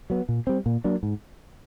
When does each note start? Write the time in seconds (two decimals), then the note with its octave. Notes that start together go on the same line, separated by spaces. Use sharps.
0.10 F#3 B3
0.29 A#2
0.47 G3 C4
0.66 A#2
0.84 F#3 A#3 D4
1.03 G#2